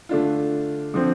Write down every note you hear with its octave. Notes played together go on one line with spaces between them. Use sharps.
D3 A3 D4 F4
D3 F3 C4